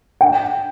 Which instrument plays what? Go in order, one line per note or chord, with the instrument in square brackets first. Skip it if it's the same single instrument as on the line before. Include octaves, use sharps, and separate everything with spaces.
[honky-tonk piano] G5